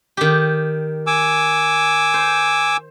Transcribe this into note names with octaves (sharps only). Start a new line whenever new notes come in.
D#3 G4
G#5 D6 E6
C5